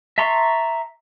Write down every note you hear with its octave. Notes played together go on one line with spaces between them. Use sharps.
E5 A5 A#5 C6 C#6